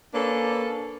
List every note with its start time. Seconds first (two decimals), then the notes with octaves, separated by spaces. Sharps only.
0.14 A#3 C#4 D4 A4 B4